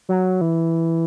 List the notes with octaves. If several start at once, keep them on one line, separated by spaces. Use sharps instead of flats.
F#3
E3